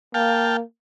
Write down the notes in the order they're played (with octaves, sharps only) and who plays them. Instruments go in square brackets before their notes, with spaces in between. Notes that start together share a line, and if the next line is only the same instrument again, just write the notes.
[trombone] A#3 [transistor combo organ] F5 G5 A5